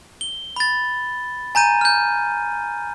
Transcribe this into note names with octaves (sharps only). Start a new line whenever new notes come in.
G7
B5 A6
G#5 A#5 G6 D#7
F6 G6